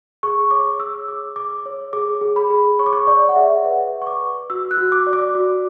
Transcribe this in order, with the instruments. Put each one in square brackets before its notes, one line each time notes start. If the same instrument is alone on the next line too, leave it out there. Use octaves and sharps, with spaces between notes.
[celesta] G#4 C#6
C#5 D6
G#4 E6
G#4 D6
G#4 D6
C#5
G#4 D6
G#4
B5
G#4
C#5 C#6
D6
C#6
C#5 D5
F#5
G#4 E5
B4 F#5
D5
C#6
D6
B4
F#4 E6
F#6
F#4
D6
D5
D6
F#4